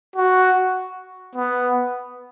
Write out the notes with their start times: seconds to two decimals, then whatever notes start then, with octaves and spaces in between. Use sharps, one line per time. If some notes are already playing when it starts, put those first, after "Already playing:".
0.16 F#4
1.35 B3